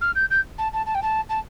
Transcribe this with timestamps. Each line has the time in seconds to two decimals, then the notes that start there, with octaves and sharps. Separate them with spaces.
0.01 F6
0.15 G6
0.30 G6
0.58 A5
0.73 A5
0.86 A5
0.94 G5
1.02 A5
1.29 A5